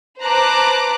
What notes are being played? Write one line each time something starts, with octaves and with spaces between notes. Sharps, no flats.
B4 C5 A5 A#5 D6 F#6